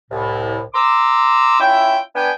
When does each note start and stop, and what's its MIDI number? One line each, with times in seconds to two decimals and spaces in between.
0.11 0.60 36
0.11 0.60 45
0.74 1.60 82
0.74 1.60 84
0.74 1.60 86
0.74 1.60 88
1.60 1.99 61
1.60 1.99 64
1.60 1.99 65
1.60 1.99 76
1.60 1.99 79
2.15 2.31 59
2.15 2.31 62
2.15 2.31 79
2.15 2.31 80